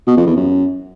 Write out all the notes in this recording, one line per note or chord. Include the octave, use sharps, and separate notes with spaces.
B2
F2
E2
F#2